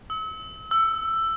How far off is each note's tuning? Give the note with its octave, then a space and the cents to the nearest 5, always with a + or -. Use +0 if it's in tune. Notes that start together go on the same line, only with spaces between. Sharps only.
E6 -40
E6 +10